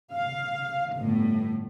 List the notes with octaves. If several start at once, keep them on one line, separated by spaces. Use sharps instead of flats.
F5
G1 A2